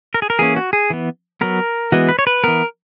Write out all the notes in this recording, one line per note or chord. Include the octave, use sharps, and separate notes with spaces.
A#4
G#4
A#4
E3 A#3 C#4 G#4
F#4
G#4
E3 B3
F#3 B3 A#4
E3 G#3 B3 F#4
B4
C#5
B4
E3 B3 A#4